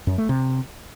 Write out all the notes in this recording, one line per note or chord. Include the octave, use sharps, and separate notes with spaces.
F#2
A3
C3